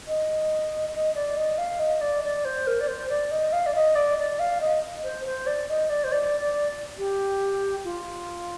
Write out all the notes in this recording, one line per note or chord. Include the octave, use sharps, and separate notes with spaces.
D#5
D#5
D5
D#5
F5
D#5
D5
D5
C5
A#4
D5
C5
D5
D#5
F5
D5
D#5
D5
D5
F5
D#5
C5
C5
D5
D#5
D5
C5
D5
D5
G4
F4